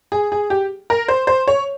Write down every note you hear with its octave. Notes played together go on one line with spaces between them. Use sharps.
G#4
G#4
G4
A#4
C5
C5
C#5